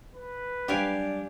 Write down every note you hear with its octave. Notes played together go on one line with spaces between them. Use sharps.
B4
F#3 G3 D4 G4 F5 G#5